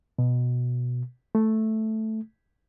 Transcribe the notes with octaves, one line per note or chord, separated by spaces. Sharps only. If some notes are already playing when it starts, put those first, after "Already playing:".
B2
A3